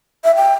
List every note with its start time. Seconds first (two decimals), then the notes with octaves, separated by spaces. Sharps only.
0.24 E5
0.36 G5